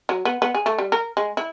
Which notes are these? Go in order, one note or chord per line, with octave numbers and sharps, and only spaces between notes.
F#3
B3
B3
G#4
A3
G3
A#4
G#3
E4